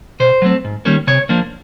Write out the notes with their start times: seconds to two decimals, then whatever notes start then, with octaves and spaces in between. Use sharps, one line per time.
0.20 B2 C5
0.42 F#3 A3 C4
0.64 G#2
0.85 D#3 G3 A#3 C#4
1.07 C3 C#5
1.29 F3 A#3 D4